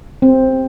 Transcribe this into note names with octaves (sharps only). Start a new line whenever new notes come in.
C4